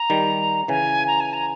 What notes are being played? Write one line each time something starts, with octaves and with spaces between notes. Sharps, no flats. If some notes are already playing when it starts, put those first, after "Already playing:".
Already playing: A#5
D#3 G3
C#3 E3 G#5
A#5
G#5
A#5